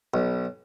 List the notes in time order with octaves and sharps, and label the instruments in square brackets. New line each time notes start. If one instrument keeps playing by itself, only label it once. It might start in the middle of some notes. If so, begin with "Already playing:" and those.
[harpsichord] B1